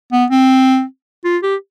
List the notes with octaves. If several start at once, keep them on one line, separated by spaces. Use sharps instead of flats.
B3
C4
F4
G4